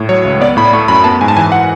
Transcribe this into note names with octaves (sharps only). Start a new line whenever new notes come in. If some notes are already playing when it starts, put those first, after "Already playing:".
Already playing: A2
F#3 C#5
C#2
B3 D5
A2 B5
A3 C#6
F#2 B5
B3 A5
G#2 G#5
A5
E3 G#5
F#5